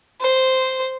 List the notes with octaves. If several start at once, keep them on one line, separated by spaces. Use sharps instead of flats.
C5